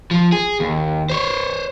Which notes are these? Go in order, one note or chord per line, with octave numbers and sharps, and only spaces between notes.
F3
G#4
D#2
C5 C#5